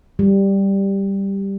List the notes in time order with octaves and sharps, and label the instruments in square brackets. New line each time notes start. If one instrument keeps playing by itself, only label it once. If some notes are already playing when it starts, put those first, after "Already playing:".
[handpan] G3